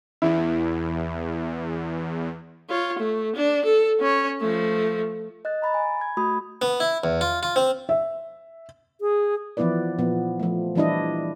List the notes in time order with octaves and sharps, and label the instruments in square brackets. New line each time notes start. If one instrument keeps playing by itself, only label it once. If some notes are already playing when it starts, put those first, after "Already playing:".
[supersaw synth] E2 [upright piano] E4
[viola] F4 C#5
A3
D4
A4
C#4 C#5
F3 A3
[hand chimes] D#5 F#6 A6
A#5 B5 A6
G#5
B5 G#6
A3 F#4 B5 D#6
[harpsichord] B3
E4
E2
F4
F4
C4
[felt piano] E5
[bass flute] G#4
[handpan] E3 F3 B3 E4 B4 D5
A#2 F3 B3
F3 A3
E3 G3 D4 E4 D#5